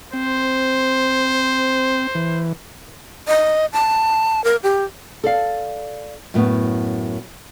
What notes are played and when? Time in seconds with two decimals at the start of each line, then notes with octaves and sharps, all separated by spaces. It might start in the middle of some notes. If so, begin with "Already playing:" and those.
0.13 C4 C5
2.15 E3
3.27 D#5
3.73 A5
4.44 A#4
4.63 G4
5.24 A4 D5 F5
6.34 F#2 A2 B3